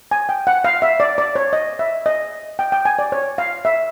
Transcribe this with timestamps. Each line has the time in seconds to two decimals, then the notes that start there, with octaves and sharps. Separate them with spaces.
0.11 G#5
0.29 G5
0.47 F#5
0.65 F5
0.82 E5
1.00 D5
1.18 D5
1.36 C#5
1.53 D#5
1.79 E5
2.06 D#5
2.59 G5
2.72 G5
2.85 G#5
2.99 D5
3.12 C#5
3.38 F5
3.65 E5